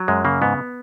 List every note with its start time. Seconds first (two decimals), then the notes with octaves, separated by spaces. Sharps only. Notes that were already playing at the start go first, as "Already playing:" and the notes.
Already playing: F#3
0.08 F#2 G#3
0.25 C#3 A#3
0.41 G#2 B3